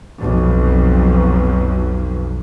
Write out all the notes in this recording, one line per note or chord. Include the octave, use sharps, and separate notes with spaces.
B1 F2